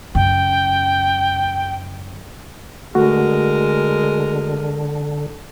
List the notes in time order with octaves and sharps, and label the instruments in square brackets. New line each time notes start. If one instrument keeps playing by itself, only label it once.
[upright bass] F#2 C#3 [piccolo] G5
[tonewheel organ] D3 [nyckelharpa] G#3 A#4 [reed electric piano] A3 F#4